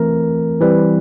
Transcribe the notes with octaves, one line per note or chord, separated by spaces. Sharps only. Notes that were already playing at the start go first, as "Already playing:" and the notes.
Already playing: E3 A3 C4 A#4
E3 G3 C4 B4